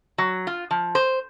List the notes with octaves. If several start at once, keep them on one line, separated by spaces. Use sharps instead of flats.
F#3
F4
F3
C5